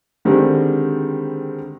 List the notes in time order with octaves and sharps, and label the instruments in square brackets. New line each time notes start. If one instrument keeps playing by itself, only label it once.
[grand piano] D3 D#3 G3 G#3 C4